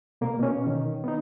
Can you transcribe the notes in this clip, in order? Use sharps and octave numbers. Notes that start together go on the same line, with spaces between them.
B2 A#3 A#4
B2 C#4
D#3
B3 D#4